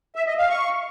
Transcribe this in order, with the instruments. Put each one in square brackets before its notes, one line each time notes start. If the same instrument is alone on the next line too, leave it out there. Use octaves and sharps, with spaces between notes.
[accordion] E5
D#5
F5
C#6